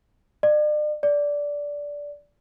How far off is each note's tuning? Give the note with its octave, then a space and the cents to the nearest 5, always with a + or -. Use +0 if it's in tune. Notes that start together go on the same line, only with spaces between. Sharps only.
D5 +40
D5 -15